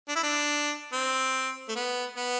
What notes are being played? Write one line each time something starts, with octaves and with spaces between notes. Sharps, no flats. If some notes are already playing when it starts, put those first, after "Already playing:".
D4
E4
D4
C4
A3
B3
B3